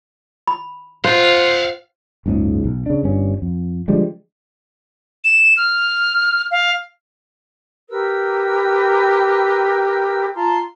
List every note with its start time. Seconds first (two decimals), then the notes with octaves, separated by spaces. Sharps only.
0.47 B5
1.04 F4 C5 F5 F#5
2.26 F#1 C#2 G#2 C#3
2.64 B1
2.86 C#3 D4
3.03 G1 G2 C#4
3.42 F2
3.88 D3 F3 G3 G#3
5.24 E7
5.57 F6
6.51 F5
7.90 G4 A#4 B4 E6
10.35 F4 A5 A#5 C6